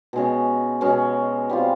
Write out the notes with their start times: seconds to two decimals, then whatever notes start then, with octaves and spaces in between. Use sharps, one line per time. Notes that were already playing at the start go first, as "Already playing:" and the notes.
0.13 B2 G#3 C#4
0.81 B2 G#3 C#4
1.50 G3 C4 F4